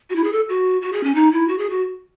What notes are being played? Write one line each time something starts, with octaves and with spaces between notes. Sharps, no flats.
F#4
E4
G#4
A4
F#4
F#4
G#4
C#4
D#4
E4
F#4
G#4
F#4